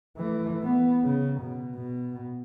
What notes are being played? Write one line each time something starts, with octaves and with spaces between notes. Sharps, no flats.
E3 A3
B3
C#3
B2
B2